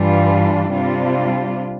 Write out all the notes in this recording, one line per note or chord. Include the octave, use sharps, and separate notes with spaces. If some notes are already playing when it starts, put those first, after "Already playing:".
Already playing: G2 E3 G3 D4 F4
C3 G3 D4 F4